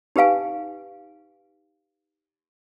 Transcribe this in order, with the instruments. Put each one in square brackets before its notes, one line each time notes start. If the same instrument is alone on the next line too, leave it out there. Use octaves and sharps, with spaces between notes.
[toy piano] D#4 G4 B4 F5 G#5